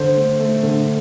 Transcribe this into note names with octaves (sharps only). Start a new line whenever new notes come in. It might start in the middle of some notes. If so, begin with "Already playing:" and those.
Already playing: D3 C5
A3
A3
D3